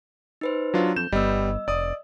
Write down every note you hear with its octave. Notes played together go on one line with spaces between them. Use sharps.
D#4 B4 C5
F#3 D4 F4
F2 G6 E7
G1 G3 B3 D#5 E6
F1 D5 D#6